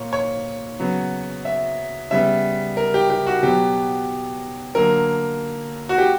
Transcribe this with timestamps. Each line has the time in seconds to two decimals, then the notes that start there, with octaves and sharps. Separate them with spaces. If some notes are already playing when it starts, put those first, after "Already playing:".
Already playing: A#2 A#3 C#5
0.13 C#5
0.79 C#3 F#3 B3
1.45 E5
2.11 C#3 G3 B3 E5
2.77 A#4
2.94 G4
3.10 G4
3.27 F#4
3.43 B2 F#3 B3 G4
4.75 D3 F#3 A#3 A#4
5.89 F#4
5.98 G4